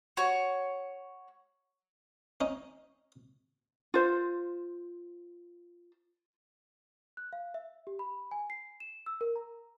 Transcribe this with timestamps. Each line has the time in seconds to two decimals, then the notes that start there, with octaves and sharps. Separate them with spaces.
0.17 F#4 C#5
2.41 C#4 D#4
3.94 F4 C5
7.17 F#6
7.33 F5
7.54 E5
7.87 G4
7.99 B5
8.31 G#5
8.50 C7
8.80 E7
9.06 E6
9.21 A#4
9.36 A#5